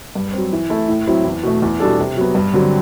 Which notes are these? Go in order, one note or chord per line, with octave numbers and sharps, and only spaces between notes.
G2
F#3 C4
E3
A3 E4 A4
A2
F#3 C4 E4
E2
B2 A3
E2
B2 G3 D4 A4
C3
F#3 B3
G2
D3 F#3 C4 G4